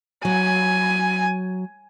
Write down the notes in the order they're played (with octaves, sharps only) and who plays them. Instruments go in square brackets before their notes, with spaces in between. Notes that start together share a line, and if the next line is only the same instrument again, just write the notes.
[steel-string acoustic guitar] F#3 [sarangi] G#5